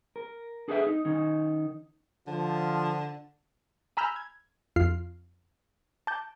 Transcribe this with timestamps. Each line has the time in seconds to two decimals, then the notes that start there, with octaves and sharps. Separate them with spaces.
0.16 A#4
0.68 D4 G#4 A4 B4 C5 E5
0.87 D#4
1.05 D#3 C#4 D#4
2.27 D3 F3
3.97 G#5 A#5 B5 E6 F6 G6
4.16 G#6
4.76 F2 F4 F6 C7
6.07 A5 D6 G6